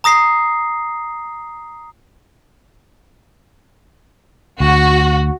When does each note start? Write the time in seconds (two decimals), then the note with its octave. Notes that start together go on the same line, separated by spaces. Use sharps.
0.04 A#5 D#6 A#6 C7
4.60 D2 F#4